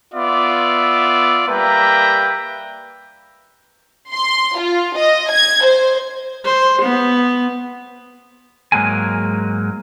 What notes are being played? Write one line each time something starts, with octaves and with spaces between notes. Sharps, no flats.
B3 F4 D5 E5
G3 A#3 B4 E5 G5 A#5
C6
F4
D#5
G#6
C5
C5
B3
G#2 F#3 G#3 A#3 G#5